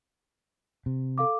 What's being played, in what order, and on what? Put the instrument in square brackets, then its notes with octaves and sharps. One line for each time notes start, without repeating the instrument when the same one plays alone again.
[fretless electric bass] C3
[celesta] A4 F5 D6